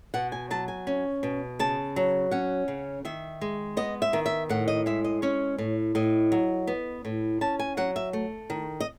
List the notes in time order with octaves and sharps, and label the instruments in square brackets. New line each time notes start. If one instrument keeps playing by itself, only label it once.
[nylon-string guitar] B2 F#5
G#5
F#3 A5
G#5
C#4
B2
C#3 A5
F#3
C#4 F#5
C#3
D#3 E5
G#3
B3 D#5
E5
D#3
E5
A2 F#5
D#5
G#3 E5
D#5
C#4 C#5
A2
A2 D#5
F#3
B3
A2
C#4 A5
G#5
F#3 F#5
E5
A3
D#3
D#5